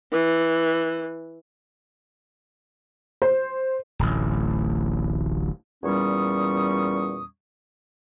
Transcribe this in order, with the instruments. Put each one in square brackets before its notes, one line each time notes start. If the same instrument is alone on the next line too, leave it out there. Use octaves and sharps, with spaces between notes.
[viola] E3
[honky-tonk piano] C5
[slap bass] D1 A1
[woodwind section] E2 A#2 G3 C#4 C#6 D#6